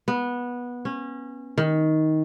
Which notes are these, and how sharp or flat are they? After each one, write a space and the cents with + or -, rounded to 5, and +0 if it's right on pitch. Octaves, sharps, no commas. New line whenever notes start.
B3 -15
C#4 -25
D#3 +10